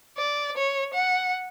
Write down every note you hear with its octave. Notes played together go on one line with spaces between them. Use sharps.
D5
C#5
F#5